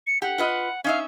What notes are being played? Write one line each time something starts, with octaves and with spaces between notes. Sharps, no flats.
C#7
G4 F#5
F4 B4 D#5
C#4 D#4 E5 F5